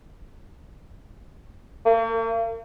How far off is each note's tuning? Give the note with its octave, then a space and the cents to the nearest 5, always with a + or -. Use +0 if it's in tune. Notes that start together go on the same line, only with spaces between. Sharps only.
A#3 -45